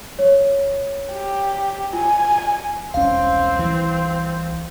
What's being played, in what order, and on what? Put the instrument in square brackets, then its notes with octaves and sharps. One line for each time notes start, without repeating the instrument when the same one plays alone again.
[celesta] C#5
[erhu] G4
[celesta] F4 [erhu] G#5
[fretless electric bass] E1 C#4 [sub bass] C2 [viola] C4 [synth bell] F5
[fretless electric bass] E3